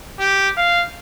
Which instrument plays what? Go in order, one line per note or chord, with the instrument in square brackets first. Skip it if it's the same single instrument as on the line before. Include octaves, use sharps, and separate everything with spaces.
[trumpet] G4
F5